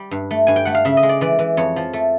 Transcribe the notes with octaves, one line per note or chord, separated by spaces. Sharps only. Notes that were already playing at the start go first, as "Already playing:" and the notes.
Already playing: G3
G2
A3
G2 G#5
G5
A3 F#5
F5
C#3 E5
D#5
G#3
D5
E3 D5
E3
F2 C#5
F3
A3